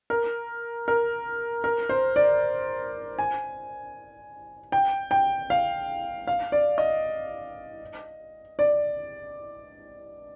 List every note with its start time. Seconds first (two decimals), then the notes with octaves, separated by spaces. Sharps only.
0.10 A#4
0.88 A#4
1.64 A#4
1.89 C5
2.16 D5
3.19 G#5
4.72 G5
5.11 G5
5.50 F5
6.27 F5
6.52 D5
6.78 D#5
8.59 D5